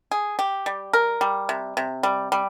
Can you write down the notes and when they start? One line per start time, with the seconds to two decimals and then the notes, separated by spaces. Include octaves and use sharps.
0.11 G#4
0.39 G4
0.66 G3
0.93 A#4
1.21 G3
1.49 C3
1.77 C3
2.03 G3
2.32 G3